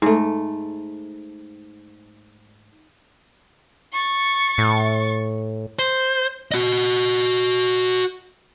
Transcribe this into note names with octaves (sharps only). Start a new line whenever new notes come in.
G#2 A3
C#6 A6
A2
C5
F#4 D#5